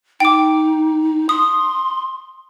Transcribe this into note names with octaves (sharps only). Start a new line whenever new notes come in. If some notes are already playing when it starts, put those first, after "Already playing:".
D#4 G5 D6
C6 D#6